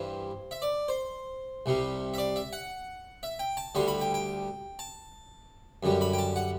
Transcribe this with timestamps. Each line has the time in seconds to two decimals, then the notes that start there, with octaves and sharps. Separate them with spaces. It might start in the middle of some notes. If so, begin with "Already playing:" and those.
Already playing: G2 E3 G3 C5
0.51 E5
0.62 D5
0.88 C5
1.66 C2 C3 G3
2.14 E5
2.18 D5
2.36 E5
2.53 F#5
3.23 E5
3.39 G5
3.57 A5
3.75 D2 D3 G3 C6
3.88 B5
4.01 G5
4.14 G5
4.79 A5
5.83 F#2 D3 G3
6.01 B5
6.13 G5
6.19 A5
6.36 F#5